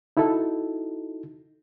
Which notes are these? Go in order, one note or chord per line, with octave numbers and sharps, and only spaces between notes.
D#4 E4 F#4 A4